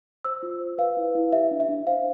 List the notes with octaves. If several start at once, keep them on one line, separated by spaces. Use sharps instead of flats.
C5 E6
F4
C5
B4 F5
E4
E4
G4 E5
D4
E5
D4
C5 F5